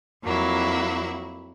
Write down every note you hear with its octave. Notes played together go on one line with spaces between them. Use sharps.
F2 F#3 A#3 E4